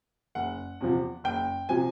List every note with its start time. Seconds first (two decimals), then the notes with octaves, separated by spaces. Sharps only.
0.35 F#1 F#5
0.81 E2 C3 F3
1.24 F#1 G5
1.69 C3 F3 G#5